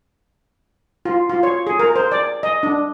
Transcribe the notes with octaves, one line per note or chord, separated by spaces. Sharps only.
F4
F4
C#5
G#4
A#4
C5
D5
D#5
D4